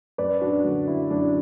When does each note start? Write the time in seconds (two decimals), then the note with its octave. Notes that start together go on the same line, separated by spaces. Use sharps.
0.18 F#2 B4 D5
0.41 D4 F#4
0.65 D3 F#3
0.88 E4
1.11 F#2 D4